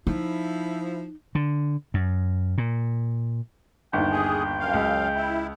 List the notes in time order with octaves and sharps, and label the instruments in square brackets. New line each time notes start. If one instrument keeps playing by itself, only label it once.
[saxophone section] F3 E4 [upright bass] D#4
[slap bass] D3
F#2
A#2
[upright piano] G1 D#2 [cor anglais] G5
[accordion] G#4
F#2 F5
[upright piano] C#2
[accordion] E4